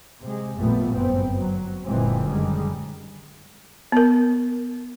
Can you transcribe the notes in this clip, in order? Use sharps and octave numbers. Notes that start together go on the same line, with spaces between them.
C3 G#3
A1 F2 A#2 G3 A3 B3
G1 F#2 B3 C4
F#3
F#1 A#2 D3 E3 G#3 C4
F#2 D3 D#3 G3 G#3
B3 A#4